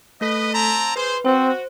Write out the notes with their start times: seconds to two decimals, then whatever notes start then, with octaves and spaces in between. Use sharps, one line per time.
0.21 A3 A4 B4 D#5 B6
0.53 C4 A5 A#5
0.96 G#4 B4 C5
1.25 C4 F#4 C5